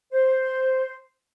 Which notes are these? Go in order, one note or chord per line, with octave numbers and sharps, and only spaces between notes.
C5